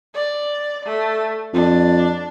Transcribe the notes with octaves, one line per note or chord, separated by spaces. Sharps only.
D5
A3
F2 D4